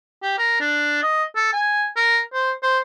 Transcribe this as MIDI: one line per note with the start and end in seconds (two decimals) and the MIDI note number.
0.22 0.37 67
0.38 0.58 70
0.60 1.00 62
1.03 1.24 75
1.36 1.49 69
1.53 1.86 80
1.96 2.20 70
2.33 2.51 72
2.63 2.79 72